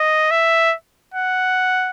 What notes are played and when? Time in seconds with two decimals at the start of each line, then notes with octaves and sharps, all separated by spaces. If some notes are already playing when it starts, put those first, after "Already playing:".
Already playing: D#5
0.31 E5
1.14 F#5